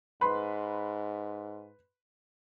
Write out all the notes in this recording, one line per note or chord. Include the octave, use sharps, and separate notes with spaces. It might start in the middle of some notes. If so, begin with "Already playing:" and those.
G#2 B4 C6